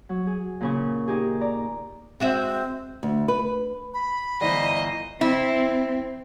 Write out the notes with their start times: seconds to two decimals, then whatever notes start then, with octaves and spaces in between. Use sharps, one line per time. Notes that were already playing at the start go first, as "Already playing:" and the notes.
0.09 F#3
0.27 G#4
0.61 A#2 C#3 C#6
1.08 D#4 G4 G#4
1.41 D5 A#5
2.20 G#3 C4 F#4 E5
3.03 D2
3.28 B4
3.94 B5
4.41 G1 E3 C5 D5 D#5 A#5
5.21 C4 E4